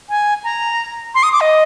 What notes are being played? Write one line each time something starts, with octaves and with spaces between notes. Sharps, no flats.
G#5
A#5
C6
D#6
D6
D#5